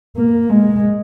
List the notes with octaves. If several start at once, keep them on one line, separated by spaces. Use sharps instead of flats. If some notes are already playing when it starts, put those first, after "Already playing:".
A#3
G#3